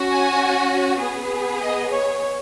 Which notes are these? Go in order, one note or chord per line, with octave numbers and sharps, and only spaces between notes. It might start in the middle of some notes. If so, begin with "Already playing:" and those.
Already playing: C#4 F#4
G#5
B3 G#4
D#5
C#5